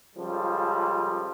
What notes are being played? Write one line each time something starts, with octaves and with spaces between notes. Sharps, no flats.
C#2 F3 G3 A4